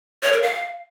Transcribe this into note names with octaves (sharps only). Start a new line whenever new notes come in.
C#5
A#4
F5